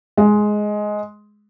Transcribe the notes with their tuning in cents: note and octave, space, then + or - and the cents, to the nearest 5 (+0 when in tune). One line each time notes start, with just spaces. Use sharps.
G#3 +10